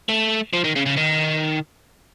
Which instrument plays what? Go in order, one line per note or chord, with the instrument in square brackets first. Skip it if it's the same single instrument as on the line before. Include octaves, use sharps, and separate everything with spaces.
[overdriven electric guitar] A3
F3
D#3
C#3
C#3
D#3